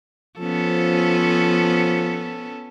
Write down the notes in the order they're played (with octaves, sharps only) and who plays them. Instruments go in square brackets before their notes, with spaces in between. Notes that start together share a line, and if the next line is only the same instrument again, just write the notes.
[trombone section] F3 [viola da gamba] B3 C#4 A4